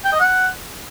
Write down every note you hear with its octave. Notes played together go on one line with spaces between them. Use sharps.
G5
D#5
F#5